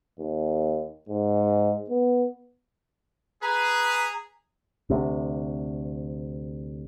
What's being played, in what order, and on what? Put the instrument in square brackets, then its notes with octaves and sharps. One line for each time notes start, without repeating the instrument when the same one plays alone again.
[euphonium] D#2
G#2
B3
[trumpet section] G#4 [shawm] B4 [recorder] A#5
[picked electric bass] D2 C3